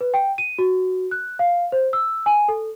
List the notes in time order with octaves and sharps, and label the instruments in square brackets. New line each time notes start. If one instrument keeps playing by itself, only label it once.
[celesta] B4
G5
D#7
F#4
F#6
F5
C5
E6
G#5
A4